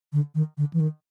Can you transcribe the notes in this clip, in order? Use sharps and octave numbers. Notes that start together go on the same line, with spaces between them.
D3
D#3
D3
E3
D#3